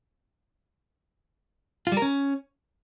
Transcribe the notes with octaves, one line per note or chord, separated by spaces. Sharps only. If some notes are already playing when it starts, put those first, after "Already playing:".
F4
G3
A#4
C#4